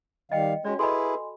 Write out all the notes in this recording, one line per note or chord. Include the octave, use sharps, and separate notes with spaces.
D#3 G3 D#5 F5 G5
G#3 C#4 F#4 D5
E4 G#4 A4 B4 D#5 G#5 B5 C6